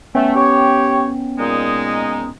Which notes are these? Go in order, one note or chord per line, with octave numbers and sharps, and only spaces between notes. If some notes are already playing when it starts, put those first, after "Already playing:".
A3 B3 C#4 G5
G4 C#5
A#2 G#3 D#4